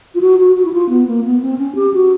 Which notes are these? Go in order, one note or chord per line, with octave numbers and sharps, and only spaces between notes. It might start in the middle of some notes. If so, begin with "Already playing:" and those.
F4
F#4
F#4
F#4
E4
F4
B3
A#3
B3
C4
C#4
G4
F#4